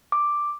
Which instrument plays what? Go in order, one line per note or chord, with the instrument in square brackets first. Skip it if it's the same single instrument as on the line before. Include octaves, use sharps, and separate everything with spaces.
[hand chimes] D6